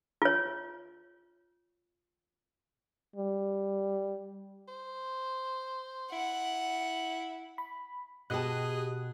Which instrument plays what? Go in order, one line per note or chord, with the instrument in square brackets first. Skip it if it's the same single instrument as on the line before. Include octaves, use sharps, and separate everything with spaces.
[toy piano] F4 C#5
[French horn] G3
[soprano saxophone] C5
[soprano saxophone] E4 [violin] F#5
[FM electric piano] B5
[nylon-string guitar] B2 A5 [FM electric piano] G4 F#6 [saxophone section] G#4 D#5